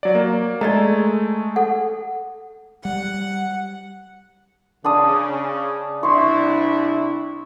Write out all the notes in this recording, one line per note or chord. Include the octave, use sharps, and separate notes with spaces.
F#3 D5
A#3
G#3 A3 D5 D#5 A#5
A4 F#5
G3 F#5
C#3 D4 A5 D#6
C2 D4 E4 C6 C#6